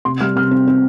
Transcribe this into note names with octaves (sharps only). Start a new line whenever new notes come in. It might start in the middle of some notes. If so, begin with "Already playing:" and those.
C3 C6
G3 F6
C3 F6
C4
C4